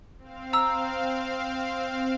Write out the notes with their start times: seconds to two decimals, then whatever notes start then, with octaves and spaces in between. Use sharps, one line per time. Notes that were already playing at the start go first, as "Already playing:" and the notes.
0.18 C4 F5
0.53 A#5 E6